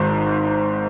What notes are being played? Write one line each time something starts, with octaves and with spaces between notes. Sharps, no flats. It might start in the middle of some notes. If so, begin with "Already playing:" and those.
Already playing: G#1 G#2 D#3 C4